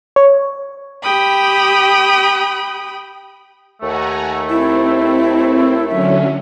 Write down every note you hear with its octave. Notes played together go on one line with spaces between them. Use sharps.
C#5
G4 G5 B5 D#6
D#2 A3 F#5 G#5 A#5
C4 E4
D3 F#3 C#4 E5